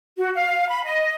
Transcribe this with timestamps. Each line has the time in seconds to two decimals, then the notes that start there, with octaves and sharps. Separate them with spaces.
0.18 F#4
0.35 F5
0.69 B5
0.84 D#5